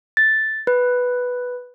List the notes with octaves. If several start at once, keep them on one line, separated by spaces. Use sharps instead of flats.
A6
B4